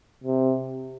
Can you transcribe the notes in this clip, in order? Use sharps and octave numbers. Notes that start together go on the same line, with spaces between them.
C3